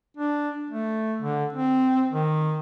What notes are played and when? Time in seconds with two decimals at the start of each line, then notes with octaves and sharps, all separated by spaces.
0.17 D4
0.71 A3
1.22 D3
1.53 C4
2.11 D#3